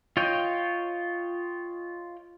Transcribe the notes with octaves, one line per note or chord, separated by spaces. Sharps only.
F4 C#5 D#5 G5